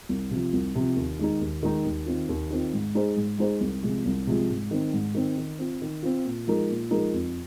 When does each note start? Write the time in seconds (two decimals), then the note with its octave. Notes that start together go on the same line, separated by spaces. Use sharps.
0.09 C2
0.31 C3 F3
0.53 C2
0.75 C3 F3
0.96 D#2
1.19 D#3 G#3 D#4
1.41 D#2
1.63 D#3 G#3 D#4
1.85 D#2
2.06 D#3 C4 F4
2.29 D#2
2.51 D#3 C4 F4
2.73 G#2
2.95 G#3 D#4 G#4 C5
3.16 G#2
3.39 G#3 D#4 G#4 C5
3.61 C2
3.83 C3 F3 G#3 F4
4.05 C2
4.27 C3 F3 G#3 F4
4.49 G#2
4.71 D#3 C4
4.93 G#2
5.15 D#3 C4
5.37 D#3
5.59 C4 F4
5.82 D#3
6.03 C4 F4
6.25 A#2
6.47 F3 G#3 D#4 A#4
6.70 A#2
6.91 F3 G#3 D#4 A#4
7.13 F2